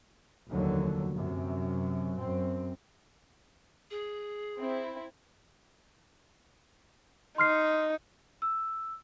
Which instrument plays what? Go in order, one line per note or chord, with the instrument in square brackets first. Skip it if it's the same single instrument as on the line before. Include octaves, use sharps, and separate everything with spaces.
[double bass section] F1 D#2 D3 F#3
F#2 C3
F#2 C4
[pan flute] G#4
[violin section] C4 E4
[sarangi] D#4 [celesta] C6 F6 C7
[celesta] E6